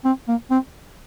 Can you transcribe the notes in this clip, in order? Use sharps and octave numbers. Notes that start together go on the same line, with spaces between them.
C4
A#3
C4